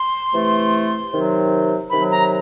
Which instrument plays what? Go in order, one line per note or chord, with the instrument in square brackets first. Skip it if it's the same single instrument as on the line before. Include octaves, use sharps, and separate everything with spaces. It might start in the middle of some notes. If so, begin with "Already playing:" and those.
Already playing: [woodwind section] C6
C3 E3 A3
C3 D#3 F#3
C3 D#3 F#3 B5
A#5